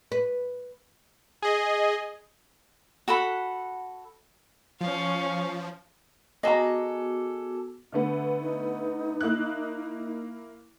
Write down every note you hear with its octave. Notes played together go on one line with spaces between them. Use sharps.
B4
G#4 D#5
F#4 A4 F#5 B5
F3 C#4 F5
B3 F#4 G#4 A4 D#5 A#5 D6
D3 A3 B3
D#4
A#3 E4 F#6